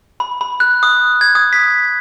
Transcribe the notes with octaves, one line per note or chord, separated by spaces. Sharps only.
B5
B5
F#6
D#6
G#6
D#6
B6